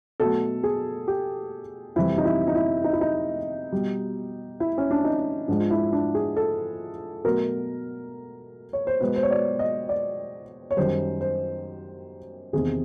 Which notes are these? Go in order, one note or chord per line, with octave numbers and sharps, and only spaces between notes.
B2 F#3 A3 A4
G#4
G4
F2 C3 E3 G3 E4
D#4
E4
D#4
E4
D#4
E4
D#4
B2 G3
E4
C#4
D4
D#4
G#2 F3 G#3 D4
F4
E4
D4
G#4
A4
B2 F#3 A3 A#4
C#5
C5
B2 G#3 B4
C5
C#5
D5
D#5
D5
C#5
F#2 D#3 G3 C5
C5
E2 C3 D#3 G#4